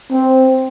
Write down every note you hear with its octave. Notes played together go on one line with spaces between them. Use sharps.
C4